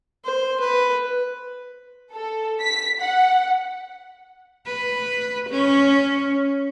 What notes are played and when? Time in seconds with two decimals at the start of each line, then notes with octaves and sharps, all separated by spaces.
0.25 C5
0.60 B4
2.13 A4
2.61 B6
3.01 F#5
4.67 B4
5.50 C#4